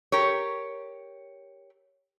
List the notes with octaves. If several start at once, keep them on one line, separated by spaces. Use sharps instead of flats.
G4 A#4 C#5